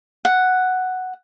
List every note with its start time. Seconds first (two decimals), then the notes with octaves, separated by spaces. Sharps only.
0.25 F#5